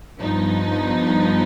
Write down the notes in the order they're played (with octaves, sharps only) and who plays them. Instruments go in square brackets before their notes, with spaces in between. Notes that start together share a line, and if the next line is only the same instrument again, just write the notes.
[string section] G2 F3 B3 D#4